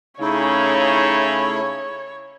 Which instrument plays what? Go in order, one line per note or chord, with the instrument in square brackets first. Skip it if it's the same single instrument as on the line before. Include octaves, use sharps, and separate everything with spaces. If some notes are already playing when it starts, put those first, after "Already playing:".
[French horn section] C#3 [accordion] A3 E4 [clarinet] D#4 [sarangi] C#5